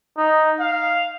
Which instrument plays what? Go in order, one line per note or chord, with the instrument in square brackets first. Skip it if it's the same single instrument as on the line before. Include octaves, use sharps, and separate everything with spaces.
[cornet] D#4
F5